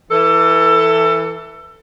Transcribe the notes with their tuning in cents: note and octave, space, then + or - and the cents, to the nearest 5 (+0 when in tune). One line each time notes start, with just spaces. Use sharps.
E3 +0 A4 +25